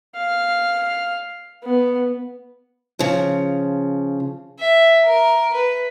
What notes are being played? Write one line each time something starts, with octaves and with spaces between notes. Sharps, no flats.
F5
B3
C#3 F3
E5
A#4
B4